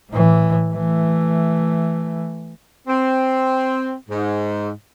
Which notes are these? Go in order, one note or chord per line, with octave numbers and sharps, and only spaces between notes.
A2 E3
E3 A3
C4
G#2